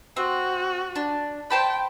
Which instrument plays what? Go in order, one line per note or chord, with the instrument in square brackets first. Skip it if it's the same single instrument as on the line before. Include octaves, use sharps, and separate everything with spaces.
[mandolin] C4 [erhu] F#4
[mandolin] D4
[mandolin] C5 A5 B5 [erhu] G5